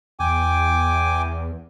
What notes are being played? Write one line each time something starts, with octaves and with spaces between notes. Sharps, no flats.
E2 G5 G#5 D6